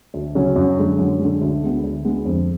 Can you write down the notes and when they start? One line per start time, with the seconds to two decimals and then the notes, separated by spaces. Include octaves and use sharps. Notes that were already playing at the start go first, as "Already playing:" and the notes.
0.14 D2
0.35 C#3 F#3 C#4
0.56 F#2
0.77 D3 G#3
0.98 F#2
1.19 D3 G#3
1.41 D2
1.62 D3 G#3 B3
1.84 D2
2.05 D3 G#3 B3
2.25 F2